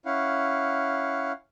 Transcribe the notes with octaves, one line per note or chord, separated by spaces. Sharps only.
C#4 E4 F5 F#5